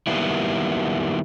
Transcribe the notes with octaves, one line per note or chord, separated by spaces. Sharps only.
D#3 F#3 G3 A#3 B3 E4